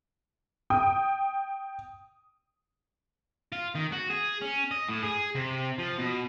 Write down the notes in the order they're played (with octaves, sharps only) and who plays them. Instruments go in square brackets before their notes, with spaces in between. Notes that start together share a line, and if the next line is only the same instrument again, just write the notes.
[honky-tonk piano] G5 D#6
[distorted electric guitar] F4
D#3
F#4
G#4
C#4
D#5
A2
G#4
C3
F3
B2